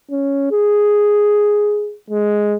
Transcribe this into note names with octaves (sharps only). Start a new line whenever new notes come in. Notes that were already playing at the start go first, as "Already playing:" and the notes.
C#4
G#4
G#3